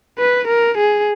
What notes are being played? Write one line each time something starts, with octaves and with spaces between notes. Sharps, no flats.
B4
A#4
G#4